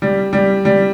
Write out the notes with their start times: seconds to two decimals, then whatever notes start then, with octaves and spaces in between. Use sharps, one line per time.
0.02 G3
0.33 G3
0.65 G3